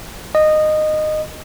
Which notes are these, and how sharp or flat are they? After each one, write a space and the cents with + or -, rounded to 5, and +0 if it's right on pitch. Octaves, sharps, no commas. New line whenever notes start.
D#5 -15